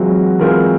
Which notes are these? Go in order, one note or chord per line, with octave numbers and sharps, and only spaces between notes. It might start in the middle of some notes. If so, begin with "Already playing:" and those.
Already playing: E3 F#3 G#3 C4 F4
E3 G#3 C4 F4 A#4